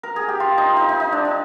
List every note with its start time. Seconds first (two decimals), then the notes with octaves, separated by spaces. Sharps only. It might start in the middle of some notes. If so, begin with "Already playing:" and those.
0.03 A#4
0.16 G#4
0.28 G4
0.40 F4
0.58 D#4
0.76 D#4
0.89 D#4
1.00 D#4
1.12 D4
1.25 D#4